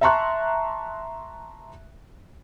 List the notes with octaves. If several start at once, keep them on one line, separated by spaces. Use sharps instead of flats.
E5 A5 A#5 C6 C#6 F#6